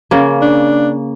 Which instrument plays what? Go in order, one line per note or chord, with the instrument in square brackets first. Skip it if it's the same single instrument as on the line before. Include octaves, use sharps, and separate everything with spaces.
[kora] C#3 A#3
[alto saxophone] D4